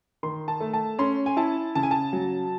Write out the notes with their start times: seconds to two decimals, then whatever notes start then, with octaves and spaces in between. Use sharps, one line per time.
0.23 D#3 C6
0.48 A5
0.60 A3
0.73 A5
0.99 C#4 C6
1.26 G#5
1.37 E4 A5
1.75 C#3 A5
1.83 G#5
1.91 A5
2.13 F#3